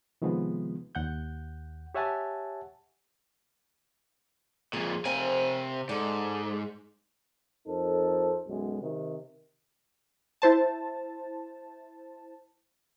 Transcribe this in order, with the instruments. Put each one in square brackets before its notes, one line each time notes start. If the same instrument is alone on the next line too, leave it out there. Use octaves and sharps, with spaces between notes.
[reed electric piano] C3 D#3 F3 G#3 B3
D#2 F#5 G6
G4 C#5 E5 F#5 G#5 A5
[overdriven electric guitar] F2 A#2 [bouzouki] G#4
[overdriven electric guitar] C3 G#5 [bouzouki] C4 A#4 F5
[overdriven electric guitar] G#2 [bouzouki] D4 A4
[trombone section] F2 D#4 A4 A#4 C5
B1 F#2 G#3
C3 D#3
[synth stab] E4 C5 A5